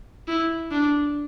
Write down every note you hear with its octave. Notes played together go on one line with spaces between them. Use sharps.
E4
D4